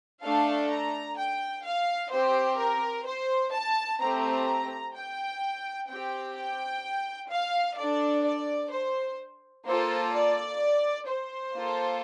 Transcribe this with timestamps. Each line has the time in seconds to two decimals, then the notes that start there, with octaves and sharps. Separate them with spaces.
0.23 A3 D4 A4 F5
0.70 A#5
1.18 G5
1.65 F5
2.12 C4 G4 C5
2.59 A#4
3.06 C5
3.53 A5
4.01 A3 C4 G4 A#5
4.95 G5
5.88 C4 G4 G5
6.36 G5
7.30 F5
7.78 D4 A4 D5
8.24 D5
8.71 C5
9.66 A#3 F4 A4 C5
10.14 D5
11.08 C5
11.55 A#3 F4 A4